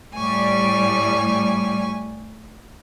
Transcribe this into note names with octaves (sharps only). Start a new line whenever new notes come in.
A2 G3 G#5 C#6